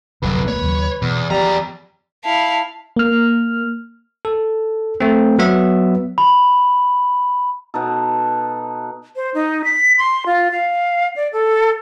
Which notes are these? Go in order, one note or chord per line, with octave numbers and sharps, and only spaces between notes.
G1 C2 F2 C3 F#3 B4
E1 G#3 A#3 C#5
D#2 C#3 F#3
E2 B2
E2 F3 G3 A#5
E4 F5 A5
A#3 F6
A4
A3 C4
F#3 B3 E5
B5
B2 D#4 A4
C5
D#4
B6
C6
F4
F5
D5
A4